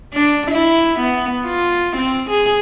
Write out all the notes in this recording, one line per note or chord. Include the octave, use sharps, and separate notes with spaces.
D4
E4
B3
F4
C4
G#4